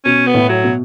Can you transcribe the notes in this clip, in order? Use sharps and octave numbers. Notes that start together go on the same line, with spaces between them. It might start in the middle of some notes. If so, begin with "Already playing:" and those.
B2 C#4
B3
A2
F#3
B2